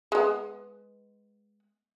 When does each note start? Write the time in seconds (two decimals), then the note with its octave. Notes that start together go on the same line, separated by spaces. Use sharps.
0.12 G#3 B3